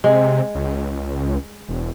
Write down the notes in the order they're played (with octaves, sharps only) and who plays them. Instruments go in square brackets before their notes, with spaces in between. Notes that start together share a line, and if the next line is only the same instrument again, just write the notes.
[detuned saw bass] C3 [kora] G#3
[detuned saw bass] C#2
E1